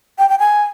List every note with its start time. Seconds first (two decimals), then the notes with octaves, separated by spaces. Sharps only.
0.19 G5
0.29 G5
0.39 G#5